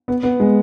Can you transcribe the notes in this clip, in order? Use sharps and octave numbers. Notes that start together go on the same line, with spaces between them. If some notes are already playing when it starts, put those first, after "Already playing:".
B3
B3
G#3